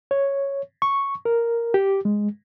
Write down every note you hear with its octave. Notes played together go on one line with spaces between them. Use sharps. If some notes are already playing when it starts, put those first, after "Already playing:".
C#5
C#6
A#4
G4
G#3